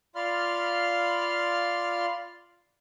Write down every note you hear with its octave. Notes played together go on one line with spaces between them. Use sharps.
F4 D5 F5 B5 C6 F6